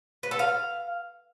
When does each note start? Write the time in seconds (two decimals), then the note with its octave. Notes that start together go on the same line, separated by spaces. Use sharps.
0.23 B4
0.31 A4
0.39 F5